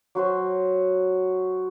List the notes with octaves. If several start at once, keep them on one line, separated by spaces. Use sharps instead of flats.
F#3 F#4 C5